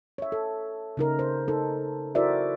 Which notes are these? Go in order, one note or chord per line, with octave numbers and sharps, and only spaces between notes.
C#5 E5
A4
C#3 D#4 A#4
C5
D#4 A4
E4 F#4 A#4 C5 D5 E5